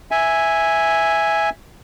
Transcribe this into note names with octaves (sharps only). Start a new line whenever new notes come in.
E5 G#5